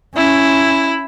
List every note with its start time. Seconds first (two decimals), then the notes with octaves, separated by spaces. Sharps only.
0.16 C#4 E4